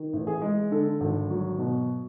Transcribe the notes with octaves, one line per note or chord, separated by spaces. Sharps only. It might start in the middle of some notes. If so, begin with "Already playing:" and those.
Already playing: D#3
A1
G#4
G#3
D3 A4
G#1
F#3
B2